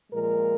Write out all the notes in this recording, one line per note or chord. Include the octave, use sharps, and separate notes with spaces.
A#2 F3 G#3 A#4